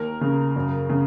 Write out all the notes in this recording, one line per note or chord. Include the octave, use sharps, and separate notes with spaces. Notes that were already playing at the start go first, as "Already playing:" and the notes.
Already playing: D#2 A#4
C#3
F#2
C#3